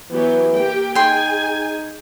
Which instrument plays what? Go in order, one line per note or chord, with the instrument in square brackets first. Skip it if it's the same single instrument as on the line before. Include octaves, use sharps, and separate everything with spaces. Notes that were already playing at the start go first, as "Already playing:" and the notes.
[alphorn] E3 [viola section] F#3 B3 G4
[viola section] A#3 G4 G5
[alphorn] D#4 [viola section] G#4 G#5 [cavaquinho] G5 C6